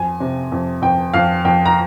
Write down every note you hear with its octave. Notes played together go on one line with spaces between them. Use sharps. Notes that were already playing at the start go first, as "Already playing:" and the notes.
Already playing: F2 G#5
C3
F2
F2 G5
F2 F5
F2 G5
A#5